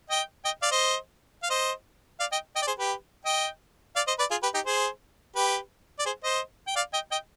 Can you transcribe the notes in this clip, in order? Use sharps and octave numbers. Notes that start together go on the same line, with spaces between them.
D#5 G5
D#5 G5
D5 F5
C5 D#5
F5
C5 D#5
D5 F5
D#5 G5
D#5 G5
D5
G#4 C5
G4 B4
D#5 G5
D5 F5
C5 D#5
B4 D5
F4 G#4
G4 B4
D#4 G4
G#4 C5
G4 B4
D5
G#4 C5
C5 D#5
G5
D5 F5
D#5 G5
D#5 G5